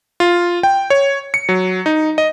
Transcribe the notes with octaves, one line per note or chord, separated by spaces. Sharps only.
F4
G5
C#5
C#7
F#3
D#4
D#5